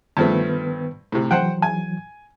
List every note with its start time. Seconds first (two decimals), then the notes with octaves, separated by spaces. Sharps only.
0.17 G2 D#3 F3 A3 B3 B4
1.12 A2 C3
1.31 E3 F#3 C5 F#5 G5
1.62 G#5